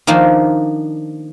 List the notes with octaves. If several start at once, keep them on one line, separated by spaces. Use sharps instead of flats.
D#3 F3 A#3 D4